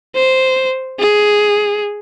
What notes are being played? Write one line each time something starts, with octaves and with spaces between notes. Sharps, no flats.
C5
G#4